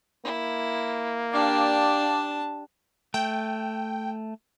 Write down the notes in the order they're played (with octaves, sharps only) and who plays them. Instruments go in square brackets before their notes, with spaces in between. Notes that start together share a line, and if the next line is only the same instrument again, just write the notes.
[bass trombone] A#3 [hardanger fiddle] E4
[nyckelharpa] D4 A5 [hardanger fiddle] G4 [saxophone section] D5 F5
[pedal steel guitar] A3 [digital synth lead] G5